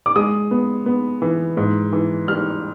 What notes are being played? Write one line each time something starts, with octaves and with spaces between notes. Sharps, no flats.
D6
G#3 D#6
B3
B3
E3
G#2
E3
G3 F6